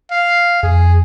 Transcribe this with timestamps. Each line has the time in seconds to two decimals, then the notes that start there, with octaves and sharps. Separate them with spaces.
0.11 F5
0.63 F2 G#4